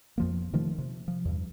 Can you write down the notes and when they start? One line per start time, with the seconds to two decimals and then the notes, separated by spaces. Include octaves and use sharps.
0.18 F2 F3 A#3
0.53 C3 D#3 F3 A3
0.78 C3
1.08 F3
1.25 E2 G2